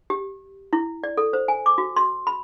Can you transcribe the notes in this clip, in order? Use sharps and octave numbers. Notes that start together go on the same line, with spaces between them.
G4
E4
D5
A4
C5
G#5
D6
F#4
C6
B5